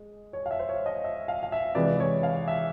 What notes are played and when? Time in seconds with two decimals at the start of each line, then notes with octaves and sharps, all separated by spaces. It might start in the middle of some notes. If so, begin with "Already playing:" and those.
Already playing: G#3
0.33 C#5
0.46 F5
0.51 E5
0.59 C5
0.69 C#5
0.86 D#5
1.04 E5
1.28 F5
1.43 F5
1.52 E5
1.75 C3 E3 G#3 D5
2.00 C#5
2.23 F5
2.48 E5